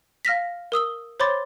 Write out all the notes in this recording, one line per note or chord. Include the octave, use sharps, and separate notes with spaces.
F5 F6 A#6 B6
A#4 D#6 E6 G7
C5 C#5 B5 C6 D6 A6